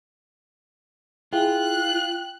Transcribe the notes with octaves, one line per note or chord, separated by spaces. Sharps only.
E4 F4 G#4 G5 F#6